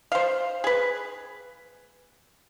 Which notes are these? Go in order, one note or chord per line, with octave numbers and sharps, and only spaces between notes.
C5 F5
G#4 B4